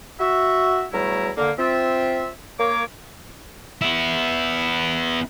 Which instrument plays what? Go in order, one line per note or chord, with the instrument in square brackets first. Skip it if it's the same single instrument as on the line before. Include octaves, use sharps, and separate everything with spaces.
[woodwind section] F#4 E5
E2 F#3 G3 A3 E4 A#5
D3 A#3
C4 F4 E5
A#3 C#5 D6
[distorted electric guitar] B3 E4